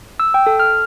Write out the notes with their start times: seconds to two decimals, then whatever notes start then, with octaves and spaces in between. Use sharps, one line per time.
0.20 E6
0.34 G5
0.47 A4
0.60 F6